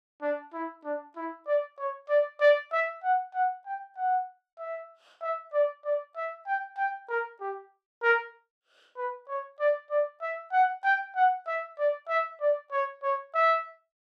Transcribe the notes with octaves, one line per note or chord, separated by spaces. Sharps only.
D4
E4
D4
E4
D5
C#5
D5
D5
E5
F#5
F#5
G5
F#5
E5
E5
D5
D5
E5
G5
G5
A#4
G4
A#4
B4
C#5
D5
D5
E5
F#5
G5
F#5
E5
D5
E5
D5
C#5
C#5
E5